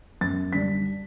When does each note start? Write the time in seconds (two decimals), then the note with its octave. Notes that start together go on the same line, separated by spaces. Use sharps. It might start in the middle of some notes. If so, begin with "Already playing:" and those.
0.21 F#2 A6
0.53 D3 G3 D4 B6